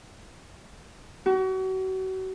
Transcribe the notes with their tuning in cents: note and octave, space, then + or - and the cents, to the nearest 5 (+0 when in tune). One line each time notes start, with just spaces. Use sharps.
F#4 +35